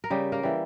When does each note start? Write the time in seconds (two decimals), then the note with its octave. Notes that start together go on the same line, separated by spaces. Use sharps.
0.04 A#4
0.10 C#3 G3 G4
0.32 A#3 A#4
0.43 E3 G3